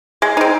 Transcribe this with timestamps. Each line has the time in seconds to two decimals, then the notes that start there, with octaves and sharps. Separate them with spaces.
0.22 G#3
0.37 C4 D#4